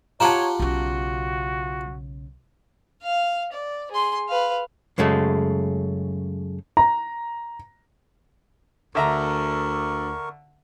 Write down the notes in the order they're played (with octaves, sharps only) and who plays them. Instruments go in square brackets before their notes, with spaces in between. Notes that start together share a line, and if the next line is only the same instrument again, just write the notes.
[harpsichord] F4 G4 F#5 [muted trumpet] C#5 [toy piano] A5 A#5
[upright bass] B1 C#3 [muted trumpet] F#4
[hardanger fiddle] F5
D5
G#4 C6
B4 F5
[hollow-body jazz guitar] F#2 C#3 G#3 A3
[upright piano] A#5
[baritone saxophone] D2 [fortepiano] D3 E5 A#5 [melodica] A#4 C#6